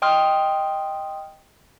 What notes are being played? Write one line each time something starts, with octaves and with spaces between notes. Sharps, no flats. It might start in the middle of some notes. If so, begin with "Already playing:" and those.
D#5 G5 C6 D#6 F6